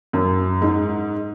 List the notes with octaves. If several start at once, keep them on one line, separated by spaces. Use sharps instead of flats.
F#2
G#2